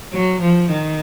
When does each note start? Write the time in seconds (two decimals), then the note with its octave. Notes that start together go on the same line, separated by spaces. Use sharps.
0.13 F#3
0.41 F3
0.70 D#3